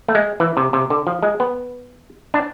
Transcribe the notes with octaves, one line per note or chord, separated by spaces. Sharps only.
A3
G#3
E3
C3
C3
D3
F3
G#3
B3
D4